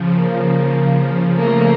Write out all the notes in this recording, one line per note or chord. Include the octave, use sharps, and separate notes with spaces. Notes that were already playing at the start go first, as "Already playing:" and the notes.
Already playing: C#3 F3
A#3
C#3 F3
C#3 F3
F3 A3 A#3